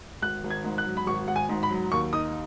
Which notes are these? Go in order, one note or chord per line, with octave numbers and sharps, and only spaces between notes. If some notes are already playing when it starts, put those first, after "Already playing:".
G#1 F#6
G#1
G#6
G#2
F#6
F#3
B5
G#1 C#6
G#1 F#5
G#5
G#2
B5
F#3
D#2 C#6
D#4 D#6